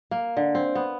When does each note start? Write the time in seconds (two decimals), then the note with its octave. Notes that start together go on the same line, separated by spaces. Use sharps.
0.11 A#3
0.37 D3
0.55 C4
0.75 B3